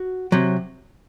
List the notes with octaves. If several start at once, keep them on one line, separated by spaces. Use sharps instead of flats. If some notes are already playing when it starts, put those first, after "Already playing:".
Already playing: F#4
C3 F#3